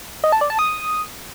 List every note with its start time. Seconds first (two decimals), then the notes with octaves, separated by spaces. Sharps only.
0.24 D#5
0.32 A5
0.41 D5
0.50 A5
0.59 D#6